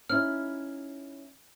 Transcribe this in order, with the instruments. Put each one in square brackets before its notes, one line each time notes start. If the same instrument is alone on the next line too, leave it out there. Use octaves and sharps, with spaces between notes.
[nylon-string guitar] C#4 D#4 E4 [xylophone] F6